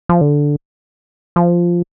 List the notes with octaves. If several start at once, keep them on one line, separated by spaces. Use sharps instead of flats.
F3
D3
F3